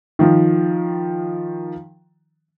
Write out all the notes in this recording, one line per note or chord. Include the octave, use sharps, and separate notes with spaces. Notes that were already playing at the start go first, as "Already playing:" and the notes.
D#3 F3